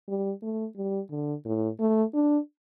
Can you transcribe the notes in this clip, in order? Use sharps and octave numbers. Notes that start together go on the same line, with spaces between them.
G3
A3
G3
D3
A2
A3
D4